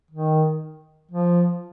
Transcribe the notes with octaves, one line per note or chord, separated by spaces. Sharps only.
D#3
F3